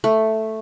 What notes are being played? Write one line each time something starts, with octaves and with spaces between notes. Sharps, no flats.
A3